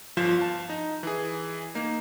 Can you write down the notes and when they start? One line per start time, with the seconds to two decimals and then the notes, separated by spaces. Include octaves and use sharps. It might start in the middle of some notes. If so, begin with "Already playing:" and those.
0.17 G1 F3 F4 F5 E7
0.38 F5 A5
0.69 D#4
1.03 E3 G#4
1.75 A#3 D#4